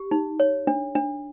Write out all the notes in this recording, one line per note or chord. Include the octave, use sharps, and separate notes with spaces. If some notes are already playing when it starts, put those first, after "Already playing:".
Already playing: G4
D#4
C#5
D4
D4